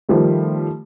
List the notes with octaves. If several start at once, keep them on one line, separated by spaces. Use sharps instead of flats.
D#3 F3 G3 A3